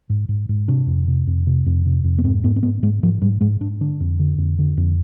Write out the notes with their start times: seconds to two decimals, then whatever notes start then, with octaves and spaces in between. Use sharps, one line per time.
0.10 G#2
0.29 G#2
0.49 G#2
0.68 C3 D4
0.87 F2
1.08 C3
1.27 F2
1.47 C3
1.66 F2
1.86 C3
2.04 F2
2.18 B3
2.24 G#2 C4
2.44 G#2 B3
2.56 C4
2.63 G#2 B3
2.82 G#2 G#3
3.03 G#2 F3
3.22 G#2 G3
3.41 G#2 G#3
3.60 G#2 D4
3.81 D3 D4
4.00 F2
4.19 D3
4.38 F2
4.59 D3
4.77 F2